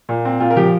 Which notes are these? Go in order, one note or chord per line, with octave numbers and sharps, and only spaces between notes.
A#2
C4
A#2 F4
A#4
F3 G4